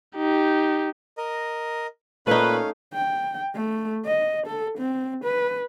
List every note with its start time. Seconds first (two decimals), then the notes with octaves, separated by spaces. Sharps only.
0.16 D#4 G4
1.18 A#4 D#5
2.27 A#2 A3 C#4 D#4 B4 F5
2.94 G5
3.55 A3
4.06 D#5
4.46 A4
4.78 C4
5.24 B4